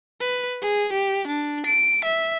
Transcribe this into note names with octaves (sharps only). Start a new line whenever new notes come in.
B4
G#4
G4
D4
D7
E5